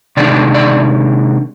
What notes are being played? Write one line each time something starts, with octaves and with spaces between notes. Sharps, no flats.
C3 D#3 G#3 D4 D5
D5